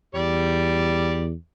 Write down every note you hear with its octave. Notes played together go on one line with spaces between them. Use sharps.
E2 G3 D5